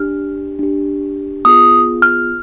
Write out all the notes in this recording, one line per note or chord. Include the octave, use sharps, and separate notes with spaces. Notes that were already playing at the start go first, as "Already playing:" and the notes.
Already playing: D4 G4 F6
D4 G4
B3 F4 G#4 D#6
F6